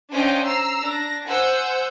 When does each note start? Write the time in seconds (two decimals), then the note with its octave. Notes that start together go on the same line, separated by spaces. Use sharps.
0.12 C#4 D4 C5 D#5 F5 G5
0.44 A#5 E6 C7
0.82 D4 A#6
1.26 C5 F#5 G#5 E6 G6